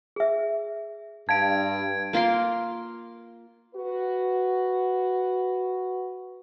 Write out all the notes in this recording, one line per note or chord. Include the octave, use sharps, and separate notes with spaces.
G#4 E5
G2 F5 A5 G#6 D7
A#3 F4 A#4 C6
F#4 B4